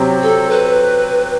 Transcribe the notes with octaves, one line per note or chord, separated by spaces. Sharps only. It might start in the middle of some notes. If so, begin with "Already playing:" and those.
Already playing: C3 F#3 C4
A4
B4